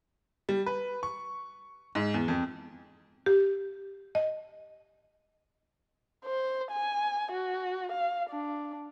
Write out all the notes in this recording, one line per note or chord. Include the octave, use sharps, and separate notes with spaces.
G3
B4
C#6
G#2
E2
F2
G4
D#5
C5
G#5
F#4
F5
D4